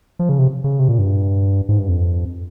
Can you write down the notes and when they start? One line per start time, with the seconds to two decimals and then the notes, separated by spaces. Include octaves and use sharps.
0.19 F3
0.29 C#3
0.39 C3
0.64 C#3
0.79 C3
0.89 A#2
0.99 G2
1.69 G#2
1.78 G2
1.89 F2